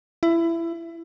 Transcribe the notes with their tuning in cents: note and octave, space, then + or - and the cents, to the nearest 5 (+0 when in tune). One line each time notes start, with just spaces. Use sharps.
E4 +20